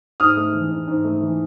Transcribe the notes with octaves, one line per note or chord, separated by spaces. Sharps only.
G#2 D#6 F6
A3
E3
G#2
G#2
A3
E3